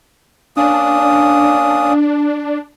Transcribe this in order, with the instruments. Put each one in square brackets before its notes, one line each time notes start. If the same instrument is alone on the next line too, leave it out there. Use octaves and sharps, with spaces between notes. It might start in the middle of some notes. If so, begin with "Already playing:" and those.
[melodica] A#3 C#4 D#6 [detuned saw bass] D4